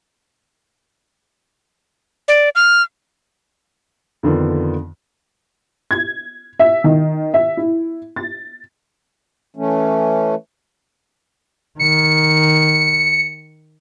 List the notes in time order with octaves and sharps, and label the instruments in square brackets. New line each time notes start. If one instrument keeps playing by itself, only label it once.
[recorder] D5
F6
[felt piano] F2 D3 D#3 B3 F4
[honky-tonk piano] G#6
E5
D#3
E5
E4
A6
[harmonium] E3 A3 C#4
[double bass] D#3 [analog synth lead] C#7